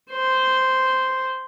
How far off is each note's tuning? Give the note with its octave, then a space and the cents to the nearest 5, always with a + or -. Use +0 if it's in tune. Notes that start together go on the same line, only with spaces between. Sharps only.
C5 -5